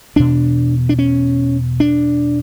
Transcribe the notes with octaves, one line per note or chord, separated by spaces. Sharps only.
E2 B2 D4
D4
C#4
D4